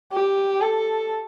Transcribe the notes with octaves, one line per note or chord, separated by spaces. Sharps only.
G4
A4